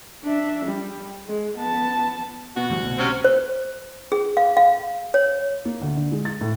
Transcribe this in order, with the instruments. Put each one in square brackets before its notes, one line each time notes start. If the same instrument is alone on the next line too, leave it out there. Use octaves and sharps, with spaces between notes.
[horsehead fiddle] D4 E5
G3
G#3
B3 A5
[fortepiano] B2 [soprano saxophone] F#4
[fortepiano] D2 [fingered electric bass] G2 E3 G3
[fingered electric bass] C2 B2
[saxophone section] C3 C4 C#4
[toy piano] C5
G#4
F5
F5
C#5
[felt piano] A#3
D2
D3
G#3
A6
A2